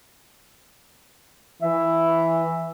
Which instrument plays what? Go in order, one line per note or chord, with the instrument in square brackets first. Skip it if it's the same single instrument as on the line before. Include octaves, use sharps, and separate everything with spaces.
[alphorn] E3 [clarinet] E5